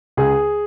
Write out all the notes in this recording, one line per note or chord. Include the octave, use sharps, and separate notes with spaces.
C#2 G#4